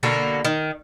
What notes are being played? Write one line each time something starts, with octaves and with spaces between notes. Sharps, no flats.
B2 D3 A#3 F#4
D#3